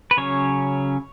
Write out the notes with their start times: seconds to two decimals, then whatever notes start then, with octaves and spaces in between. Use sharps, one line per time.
0.11 B4
0.17 C#3 F#3 C#4 C#5